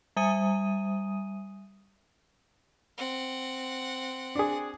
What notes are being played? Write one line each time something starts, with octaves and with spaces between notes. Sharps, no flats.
G3 E5 G#5 D#6 D#7
C4 F#5
D4 G#4